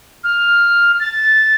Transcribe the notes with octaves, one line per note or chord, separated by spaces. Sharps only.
F6
A6